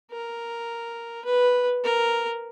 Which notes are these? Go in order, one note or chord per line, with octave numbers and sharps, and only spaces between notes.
A#4
B4
A#4